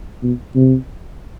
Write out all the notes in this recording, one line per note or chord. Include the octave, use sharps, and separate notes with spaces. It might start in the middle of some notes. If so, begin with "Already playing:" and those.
B2
C3